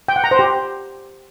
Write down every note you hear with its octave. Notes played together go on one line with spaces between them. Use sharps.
G5
F#5
A#5
C5
G4